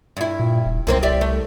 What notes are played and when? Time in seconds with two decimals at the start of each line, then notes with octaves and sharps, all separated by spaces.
0.17 G2 E4
0.39 A#2
0.65 D#1
0.87 C2 F#2 A#3 C4
1.03 G4 D5 E5
1.21 A3